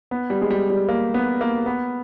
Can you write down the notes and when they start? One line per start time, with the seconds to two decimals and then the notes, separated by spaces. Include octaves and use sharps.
0.11 B3
0.30 G3
0.42 G#3
0.50 G3
0.70 G3
0.88 A#3
1.14 B3
1.41 A#3
1.66 B3